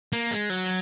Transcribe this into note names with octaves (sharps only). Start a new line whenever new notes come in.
A#3
G#3
F#3